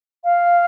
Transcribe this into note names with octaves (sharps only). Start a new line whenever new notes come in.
F5